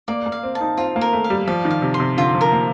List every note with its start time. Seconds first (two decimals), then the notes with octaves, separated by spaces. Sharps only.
0.08 A#3 D5
0.26 A#3
0.32 F5
0.43 C4
0.55 A5
0.61 D#4
0.77 C4 F4
0.96 A#3
1.01 A#4
1.13 A3
1.24 F5
1.30 G3
1.48 F3 D5
1.65 D#3
1.70 F5
1.82 C3
1.94 C6
2.00 C3
2.17 D3 F4
2.35 F3
2.41 A#4
2.52 A#3